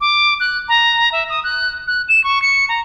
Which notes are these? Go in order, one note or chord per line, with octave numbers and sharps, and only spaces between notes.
D6
F#6
A#5
E5
D#6
F#6
F#6
E7
C#6
C#7
A#5